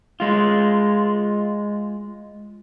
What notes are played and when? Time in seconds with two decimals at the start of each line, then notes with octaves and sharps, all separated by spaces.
0.20 G#3 F4